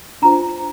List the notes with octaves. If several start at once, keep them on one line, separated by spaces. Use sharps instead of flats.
D4 F4 C5 A#5